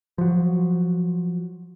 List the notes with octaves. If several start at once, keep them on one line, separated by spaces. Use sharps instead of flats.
F3 F#3